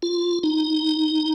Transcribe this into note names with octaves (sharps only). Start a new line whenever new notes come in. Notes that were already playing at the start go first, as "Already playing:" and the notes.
F4
D#4